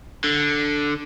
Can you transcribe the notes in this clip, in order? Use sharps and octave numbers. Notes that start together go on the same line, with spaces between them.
D3